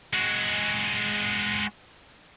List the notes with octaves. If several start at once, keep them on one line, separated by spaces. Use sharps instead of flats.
G#3 F#4